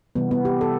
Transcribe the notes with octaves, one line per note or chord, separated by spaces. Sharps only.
C3 E3 G3 B3
B3
G4
A4